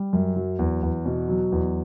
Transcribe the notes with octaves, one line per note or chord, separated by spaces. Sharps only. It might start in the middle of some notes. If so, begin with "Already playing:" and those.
Already playing: G3
F#2
F#3
E2
E2
B2
F#3
E2